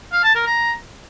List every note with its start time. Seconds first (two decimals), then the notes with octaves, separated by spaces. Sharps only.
0.12 F5
0.24 A5
0.35 A#4
0.47 A#5